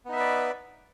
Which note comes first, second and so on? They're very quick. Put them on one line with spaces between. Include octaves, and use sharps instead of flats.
B3 D#4 E5 B4 D5